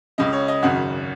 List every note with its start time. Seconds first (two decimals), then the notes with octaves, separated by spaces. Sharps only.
0.18 C#2 C#3 D#5
0.33 C#5
0.48 D#5
0.62 G#1 F#2 C#3 F#5